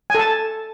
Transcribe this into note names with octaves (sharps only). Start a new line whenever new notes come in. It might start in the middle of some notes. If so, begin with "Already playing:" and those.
A4 G#5 A5